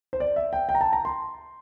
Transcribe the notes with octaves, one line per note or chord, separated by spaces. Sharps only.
C5
D5
E5
G5
G5
A#5
A5
A#5
C6